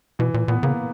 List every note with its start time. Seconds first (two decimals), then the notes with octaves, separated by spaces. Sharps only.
0.19 B2 E3
0.34 A#2
0.48 A#2 B3
0.63 C#3 A#3